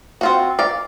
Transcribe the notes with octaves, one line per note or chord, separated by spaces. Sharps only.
C4 F4 F#4
D5 F5